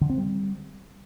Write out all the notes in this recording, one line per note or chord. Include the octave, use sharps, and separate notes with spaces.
D3
C4
G3